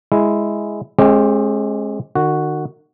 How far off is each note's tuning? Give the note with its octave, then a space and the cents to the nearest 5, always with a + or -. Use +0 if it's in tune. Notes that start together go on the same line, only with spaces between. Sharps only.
G#3 +0 E4 +0
G#3 +15 C#4 -45 G4 +0
D#3 -40 F#4 +0